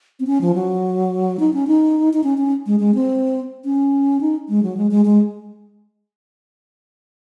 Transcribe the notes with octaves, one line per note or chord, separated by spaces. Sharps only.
C4
C#4
F3
F#3
D#4
C#4
D#4
D#4
C#4
C#4
G#3
G#3
C4
C#4
D#4
G#3
F#3
G#3
G#3
G#3